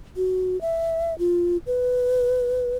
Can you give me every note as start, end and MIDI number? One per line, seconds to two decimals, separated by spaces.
0.17 0.60 66
0.61 1.17 76
1.19 1.57 65
1.67 2.77 71